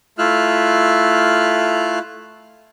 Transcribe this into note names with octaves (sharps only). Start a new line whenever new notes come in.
A3 E4 F4 E5 F6 F#6